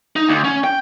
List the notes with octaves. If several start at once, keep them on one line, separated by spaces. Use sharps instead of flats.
D#4
D2
C#4
G5